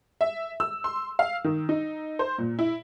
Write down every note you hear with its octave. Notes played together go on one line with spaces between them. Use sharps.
E5
E6
C6
F5
D#3
D#4
C5
A#2
E4